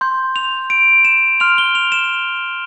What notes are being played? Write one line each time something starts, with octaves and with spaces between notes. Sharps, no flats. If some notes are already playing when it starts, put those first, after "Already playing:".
C6 G6
F7
D7
E7
C6 F6 F7
G7
F7
E7